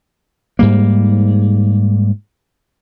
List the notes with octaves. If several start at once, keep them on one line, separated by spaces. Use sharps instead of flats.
G#2 G3 A#3